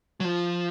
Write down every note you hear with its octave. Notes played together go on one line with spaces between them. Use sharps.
F#3
F3